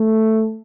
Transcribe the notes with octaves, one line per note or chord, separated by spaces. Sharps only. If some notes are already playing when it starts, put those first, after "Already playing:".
Already playing: A3